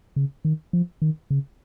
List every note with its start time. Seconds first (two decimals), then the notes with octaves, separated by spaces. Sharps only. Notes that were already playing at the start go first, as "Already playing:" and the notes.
0.16 C#3
0.45 D#3
0.73 F3
1.02 D#3
1.30 C#3